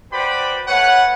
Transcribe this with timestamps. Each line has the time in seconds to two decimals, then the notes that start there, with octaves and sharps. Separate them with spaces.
0.12 F#4 B4 C5 D5 G5 B5
0.67 A3 B4 C#5 F#5